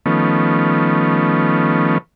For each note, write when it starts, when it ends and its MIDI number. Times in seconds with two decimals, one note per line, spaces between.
0.06 1.98 51
0.06 1.98 53
0.06 1.98 57
0.06 1.98 59
0.06 1.98 61